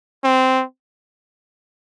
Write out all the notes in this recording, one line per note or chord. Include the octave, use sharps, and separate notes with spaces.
C4